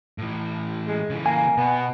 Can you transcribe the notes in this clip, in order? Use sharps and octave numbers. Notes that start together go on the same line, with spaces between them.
A2 E3
G#3
C#3 E3
A#3 G#5
B2 B3